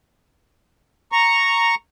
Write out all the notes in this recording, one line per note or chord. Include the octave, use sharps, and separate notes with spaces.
A#5 C#6